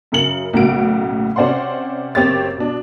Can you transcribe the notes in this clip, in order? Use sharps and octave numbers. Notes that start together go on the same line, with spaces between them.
F#2 C#3 A#4 C#7 F#7
B1 A2 C#3 A#3 F#4 D7
C3 C#4 C5 D5 F#5 C6
F#1 C4 G4 C#5 A6
B2 D4